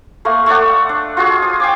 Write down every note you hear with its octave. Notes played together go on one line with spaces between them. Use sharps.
A3 A#3 C6
A3 A4 D5 F#5
D4
F4 F#4 G#4
D#6
G5 G#5 D6